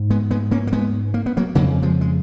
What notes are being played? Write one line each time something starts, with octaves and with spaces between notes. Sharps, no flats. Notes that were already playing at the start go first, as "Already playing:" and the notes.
Already playing: G#2
G#3 B3
G#3 B3
A#3 C#4
A#3
G#3 B3
A#3
B3
F#3 A#3
F2 C#3 F#3 A#3
F3 G#3
G#3